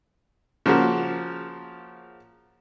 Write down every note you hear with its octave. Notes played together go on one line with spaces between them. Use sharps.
C#3 F3 A#3 F#4